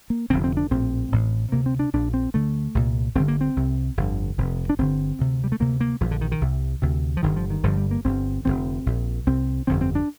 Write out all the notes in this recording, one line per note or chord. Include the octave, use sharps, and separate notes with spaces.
A#3
F1 F2 D3 C4
C4
D4
A#1 A2 C4
A1 A2
D2 C3 A#3
C4
D4
A#1 A#2 D4
C4
D2 D3 A3
C2 A#2
G1 G2 D3 C4
A#3
C4
C2 C3
G1 F2 D3
F1 F2 C3
D4
G1 G2 D3 C4
D2 C3
G3
A3
D2 C3 A#3
A#3
A#1 A#2 F3
D3
D#3
D#3
C2 C3
D2 C3
F3
G1 G2 D3 D#3
F3
D#3
G1 G2 D3 F3
G3
A#3
G1 G2 D3 C4
F1 D#2 D3 C4
A#1 A#2
C2 C3 C4
G1 F2 D3 C4
C4
D4